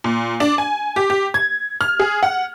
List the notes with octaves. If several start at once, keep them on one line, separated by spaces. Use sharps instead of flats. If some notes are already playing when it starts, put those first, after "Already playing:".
A#2
D4
G#5
G4
G4
G#6
F6
G#4
F#5